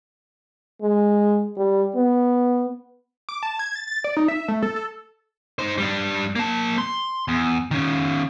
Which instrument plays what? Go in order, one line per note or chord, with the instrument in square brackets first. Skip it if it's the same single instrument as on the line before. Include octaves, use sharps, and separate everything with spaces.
[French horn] G#3
G3
B3
[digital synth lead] D6
A5
G#6
A6
A6
D5
D#4
E5
A3
A4
A4
[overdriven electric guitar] D#4 C5
G3 D4
A#3 A5
C6
E2
D#3 C#4